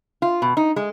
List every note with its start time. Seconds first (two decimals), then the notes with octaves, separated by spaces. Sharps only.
0.22 F4
0.42 B2
0.57 D#4
0.76 G#3